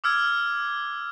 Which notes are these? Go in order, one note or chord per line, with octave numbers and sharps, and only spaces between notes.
D6 E6 F6 G#6